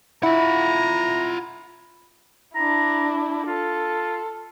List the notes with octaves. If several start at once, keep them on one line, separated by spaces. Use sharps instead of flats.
E4 F4 F#5 A#5
D4 E4 A#5
F4 A4